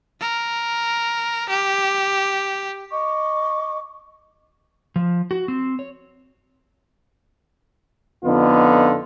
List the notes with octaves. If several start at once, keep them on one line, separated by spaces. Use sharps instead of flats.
A#4
G4
D#5 C#6 D6
F3
F#4
C4
C#5
F2 D3 B3 D#4 F4